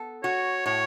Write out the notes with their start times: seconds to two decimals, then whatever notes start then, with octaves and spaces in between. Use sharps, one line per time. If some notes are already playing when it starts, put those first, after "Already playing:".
Already playing: B3 A4
0.23 F#4 C#5
0.66 A2 C#5